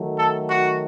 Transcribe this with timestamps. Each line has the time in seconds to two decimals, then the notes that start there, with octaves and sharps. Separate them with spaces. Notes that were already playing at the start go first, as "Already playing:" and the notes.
Already playing: D#3 F#3 A3
0.17 A4
0.50 F#4